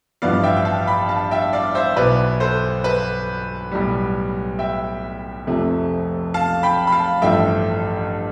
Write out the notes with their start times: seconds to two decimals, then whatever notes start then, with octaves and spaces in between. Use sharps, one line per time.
0.22 A1 G2 F3 B3 E4 D5 F5
0.43 E5 G5
0.56 G5
0.65 F5 A5
0.87 G5 B5
1.09 F5 A5
1.31 E5 G5
1.53 D5 F5
1.75 C5 E5
1.96 B1 B2 B3 E4 B4 D5
2.40 A4 C5
2.84 B4
3.72 B1 A2 G3
4.59 E5 G5
5.47 F1 F2 C3 F3 A3
6.34 F5 A5
6.63 G5 B5
6.87 B5
6.92 F5 A5
7.21 A1 G2 F3 A3 E5 G5